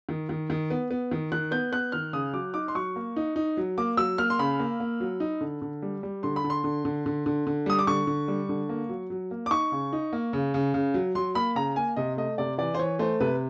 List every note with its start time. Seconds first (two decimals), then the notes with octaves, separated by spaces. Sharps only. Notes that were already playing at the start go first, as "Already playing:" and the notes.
0.09 D#3
0.29 D#3
0.50 D#3
0.70 B3
0.91 B3
1.11 D#3
1.32 D#3 F#6
1.51 B3 G6
1.72 B3 F#6
1.92 D#3 F6
2.13 C#3 D#6
2.33 F#3 D6
2.54 D#4 D6
2.68 C6
2.75 F#3 C#6
2.96 A#3
3.16 D#4
3.36 D#4
3.57 F#3
3.78 A#3 D6
3.97 F#3 E6
4.18 A#3 F6
4.30 C6
4.39 C#3 B5
4.60 A#3
4.80 A#3
5.00 F#3
5.20 D#4
5.41 D3
5.62 D3
5.82 G3
6.03 G3
6.23 D3 C6
6.36 B5
6.44 D3
6.50 C6
6.64 D3
6.85 D3
7.06 D3
7.26 D3
7.47 D3
7.66 G3 D#6
7.79 D6
7.87 D3 C#6
8.07 D3
8.28 G3
8.49 D3
8.69 A#3
8.89 F#3
9.10 F#3
9.31 A#3
9.46 D6
9.51 D#4 C#6
9.72 C#3
9.93 D#4
10.13 A#3
10.33 C#3
10.54 C#3
10.74 C#3
10.94 F#3
11.15 F#3 C6
11.35 A#3 B5
11.55 C#3 A#5
11.76 A#3 G#5
11.96 C3 D#5
12.17 A3 D#5
12.38 C3 D5
12.58 E3 D5
12.74 C5
12.79 E3 C#5
12.99 A3 C5
13.20 C3 B4